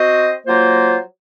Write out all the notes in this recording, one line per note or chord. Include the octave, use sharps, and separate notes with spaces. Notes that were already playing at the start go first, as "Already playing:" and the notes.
Already playing: C4 F#4 C5 D#5
F#3 A#3 F4 C5